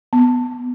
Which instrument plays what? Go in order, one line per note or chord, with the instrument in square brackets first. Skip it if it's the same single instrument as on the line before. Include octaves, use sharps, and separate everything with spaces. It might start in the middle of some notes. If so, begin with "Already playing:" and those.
[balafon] B3